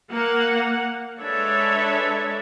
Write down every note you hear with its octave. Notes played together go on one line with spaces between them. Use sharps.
A#3 F#5
G#3 D4 A4 B4 C#5 E5